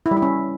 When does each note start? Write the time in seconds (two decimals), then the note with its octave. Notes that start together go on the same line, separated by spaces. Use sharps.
0.06 E4
0.11 G3
0.17 E4
0.22 C#4